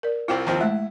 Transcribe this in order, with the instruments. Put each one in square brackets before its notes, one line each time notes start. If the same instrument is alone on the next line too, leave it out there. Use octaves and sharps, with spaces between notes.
[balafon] A#4 D5
[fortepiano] C2 C4 F4 [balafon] E4 G5
[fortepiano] D#2 F3 C4
[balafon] G#3 A3 [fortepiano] E4